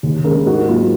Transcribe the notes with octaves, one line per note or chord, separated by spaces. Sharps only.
D#2
C#3 G#3 A#4
G#2 F#4
F#3 A#3 F4